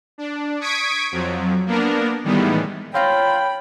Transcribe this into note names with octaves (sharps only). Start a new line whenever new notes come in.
D4
C#6 D#6 G#6 B6 D7
F2 F3 F#3
A#3 B3 D4 A#4
A2 D#3 E3 G3 G#3 B3
C4 F4 C#5 G5 A#5 B5